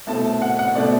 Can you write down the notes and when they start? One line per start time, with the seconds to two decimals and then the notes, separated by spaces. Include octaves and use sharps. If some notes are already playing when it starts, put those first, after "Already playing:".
0.07 C2 B2 A3 C4 A5
0.42 F#5
0.59 F#5
0.75 B2 A3 C4 D5